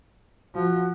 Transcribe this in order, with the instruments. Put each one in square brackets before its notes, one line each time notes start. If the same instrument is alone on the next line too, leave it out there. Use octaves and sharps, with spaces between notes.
[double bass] F3 [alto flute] F#4